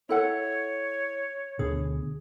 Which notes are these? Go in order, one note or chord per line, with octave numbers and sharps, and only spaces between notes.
E4 A4 C#5 F#5
D2 B2 D3 G#4